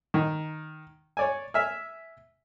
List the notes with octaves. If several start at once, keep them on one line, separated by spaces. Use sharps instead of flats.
D#3
C#5 D5 G#5
E5 G#5 F6